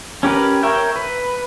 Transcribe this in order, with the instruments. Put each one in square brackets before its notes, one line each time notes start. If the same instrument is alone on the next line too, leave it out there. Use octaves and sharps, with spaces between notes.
[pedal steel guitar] C#4 G4 A#4 B4
A#4 C#5 E5 G5
B4